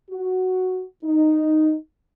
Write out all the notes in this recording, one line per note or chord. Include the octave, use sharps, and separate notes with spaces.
F#4
D#4